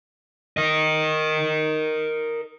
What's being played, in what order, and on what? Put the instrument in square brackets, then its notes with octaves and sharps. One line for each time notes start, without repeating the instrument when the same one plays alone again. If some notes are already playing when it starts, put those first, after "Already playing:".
[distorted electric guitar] A#4 D#5